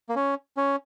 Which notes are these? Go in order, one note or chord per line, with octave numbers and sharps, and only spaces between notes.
A#3
C#4
C#4